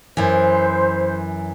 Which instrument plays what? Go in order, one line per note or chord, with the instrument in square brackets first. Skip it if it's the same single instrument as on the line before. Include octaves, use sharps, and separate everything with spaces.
[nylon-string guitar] F#2 E3 [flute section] C5